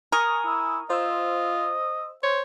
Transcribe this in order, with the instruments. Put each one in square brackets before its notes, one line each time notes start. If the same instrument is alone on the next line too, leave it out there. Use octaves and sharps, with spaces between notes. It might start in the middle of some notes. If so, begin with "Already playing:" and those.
[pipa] A#4 [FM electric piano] G#5 C#6 D#6
[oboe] E4
[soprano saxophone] F4 [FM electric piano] C5 E6 [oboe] D#5
[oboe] C5 [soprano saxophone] C#5